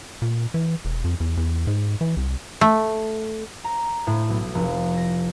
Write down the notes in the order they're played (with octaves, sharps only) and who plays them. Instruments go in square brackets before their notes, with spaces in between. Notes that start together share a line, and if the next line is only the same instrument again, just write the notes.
[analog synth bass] A#2
E3
E1
F2
E2
E2
G#2
E3
C2
[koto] A3
[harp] A#5
A2
B1
F1
A#6